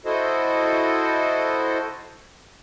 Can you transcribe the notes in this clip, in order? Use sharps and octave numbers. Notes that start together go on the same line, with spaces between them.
E4 F#4 A4 C5 D#5